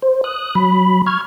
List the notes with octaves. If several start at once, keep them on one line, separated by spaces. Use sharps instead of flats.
C5
D#6 F#6
F#3 B5
C#6 F6 G#6